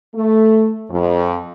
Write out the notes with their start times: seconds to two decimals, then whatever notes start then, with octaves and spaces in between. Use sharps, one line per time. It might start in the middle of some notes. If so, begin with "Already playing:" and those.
0.15 A3
0.90 F2